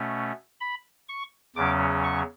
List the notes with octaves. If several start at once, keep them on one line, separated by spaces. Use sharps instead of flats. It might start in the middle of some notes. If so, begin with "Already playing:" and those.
Already playing: B2 A3 C#4
B5
C#6
E2 C#3 F#3 C#4 D6
C#6